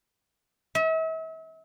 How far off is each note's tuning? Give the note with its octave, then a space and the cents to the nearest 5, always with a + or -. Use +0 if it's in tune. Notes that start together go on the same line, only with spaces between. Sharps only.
E5 -40